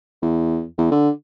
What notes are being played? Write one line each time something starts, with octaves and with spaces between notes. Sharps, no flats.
E2
E2
D3